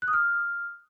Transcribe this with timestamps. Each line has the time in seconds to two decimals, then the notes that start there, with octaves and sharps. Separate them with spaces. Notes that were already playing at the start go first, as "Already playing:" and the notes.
0.02 F#6
0.08 D#6
0.13 F6